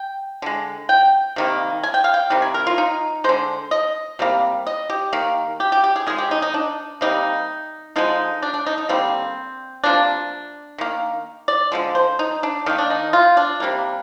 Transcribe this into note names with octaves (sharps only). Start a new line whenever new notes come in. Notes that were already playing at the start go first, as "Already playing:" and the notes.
Already playing: G5
D3 G#3
G5
C3 D#3 G3 A#3
G#5
G5
F5
G5
C3 D#3 G3
G#5
A#4
F4
D#4
D3 G#3 C5
D#5
C3 G3 A#3
D#5
G4
D#3 A#3
G4
G4
G4
G#4
D#3 G#3 G#4
G4
D#4
D#4
D4
C3 G3 A#3 D#4
D3 F3 G#3 D#4
D4
D4
D#4
D#4
D3 G3 A#3 C4
C3 F3 A#3 D4
D#3 A#3
D5
D3 F3 G#3
C5
D#4
D4
D#3 A#3 D#4
D4
D#4
F4
D4
C3 G3 A#3